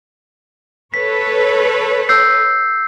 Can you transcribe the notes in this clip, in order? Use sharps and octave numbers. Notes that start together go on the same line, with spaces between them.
A4 B4 C#5 B6
E6 G6 C7